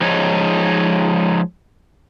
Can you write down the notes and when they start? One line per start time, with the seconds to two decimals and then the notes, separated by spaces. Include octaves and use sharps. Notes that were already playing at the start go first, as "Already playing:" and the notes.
0.01 F3 G#3 D#4 C#5